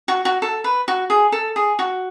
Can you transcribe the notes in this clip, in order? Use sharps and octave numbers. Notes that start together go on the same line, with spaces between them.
F#4
F#4
A4
B4
F#4
G#4
A4
G#4
F#4